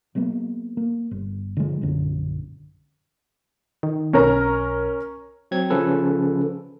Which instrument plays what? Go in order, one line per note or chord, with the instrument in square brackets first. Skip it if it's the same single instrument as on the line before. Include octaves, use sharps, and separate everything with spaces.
[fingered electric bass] F#3 G#3 A#3 B3
A#3
G1
D3 F3 G#3
A#1 F#2 D3 C#4
[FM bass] D#3
[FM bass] B1 [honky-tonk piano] C#4 A#4 A#5
[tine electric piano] F#3 C4 G#6
C#3 F3 C#4 A4 B4